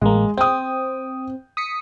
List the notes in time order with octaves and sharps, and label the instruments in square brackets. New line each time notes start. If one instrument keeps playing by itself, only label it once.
[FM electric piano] A1 A#3 [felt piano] G#3
[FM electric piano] C4 [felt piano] G5 D#6
[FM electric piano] D#6 B6 C#7